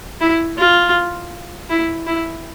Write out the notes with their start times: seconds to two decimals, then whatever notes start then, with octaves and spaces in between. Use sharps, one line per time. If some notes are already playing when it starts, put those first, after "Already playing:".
0.21 E4
0.58 F4
1.70 E4
2.07 E4